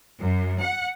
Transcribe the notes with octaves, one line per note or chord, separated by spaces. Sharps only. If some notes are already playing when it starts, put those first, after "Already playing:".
F#2
F#5